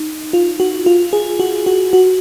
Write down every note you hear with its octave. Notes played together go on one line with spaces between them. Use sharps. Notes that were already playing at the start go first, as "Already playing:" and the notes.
Already playing: D#4
F4
F#4
F4
G#4
F#4
F#4
F#4